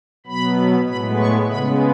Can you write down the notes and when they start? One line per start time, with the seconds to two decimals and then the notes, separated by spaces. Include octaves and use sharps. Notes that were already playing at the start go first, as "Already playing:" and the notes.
0.26 B2 F#3 B3 B5
0.87 A2 G#3 B3 B5
1.18 C#6
1.49 C#3 G#3 B3 B5